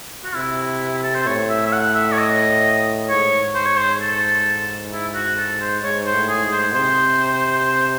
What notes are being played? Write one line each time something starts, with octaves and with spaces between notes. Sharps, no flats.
F#4
C3 E4
A4
C5
A2 C#5
E5
E5
F#5
E5
C#5
D#5
G#2 C#5
C5
C#5
C5
A4
E4
F#4
A4
C5
G#2 C#5
C5
A2
G#4
G#2
C5
C3 C5